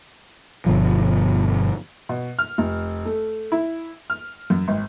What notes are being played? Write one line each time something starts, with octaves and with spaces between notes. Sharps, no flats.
G1 B2 F3
B2
F6
F1
A3
E4
F6
F#2
G#1